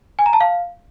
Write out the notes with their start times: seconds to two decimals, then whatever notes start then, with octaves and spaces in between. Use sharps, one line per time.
0.19 G#5
0.26 A#5
0.33 A5
0.41 F5